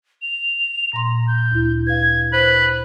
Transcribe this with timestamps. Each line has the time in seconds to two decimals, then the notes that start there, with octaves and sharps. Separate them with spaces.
0.22 F7
0.93 A#2 A#5 C6
1.28 G6
1.52 D2 E4
1.87 B4 F5 G#6
2.33 B4 C5 F#7